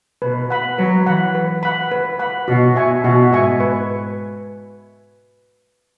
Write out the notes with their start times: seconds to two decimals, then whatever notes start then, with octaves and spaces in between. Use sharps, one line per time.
0.22 B2 B4
0.50 F#5 B5
0.78 F#3 B4
1.06 E3 F#5 B5
1.35 B4
1.63 F#5 B5
1.91 B4
2.19 F#5 B5
2.48 B2 F#4
2.76 E5 G#5 C#6
3.04 B2 F#4
3.32 G#2 E5 G#5 C#6
3.60 B4